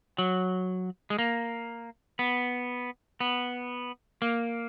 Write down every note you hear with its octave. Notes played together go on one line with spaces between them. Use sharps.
F#3
G#3
A#3
B3
B3
A#3